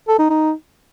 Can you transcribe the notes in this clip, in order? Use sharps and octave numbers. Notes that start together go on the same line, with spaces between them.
A4
D#4
D#4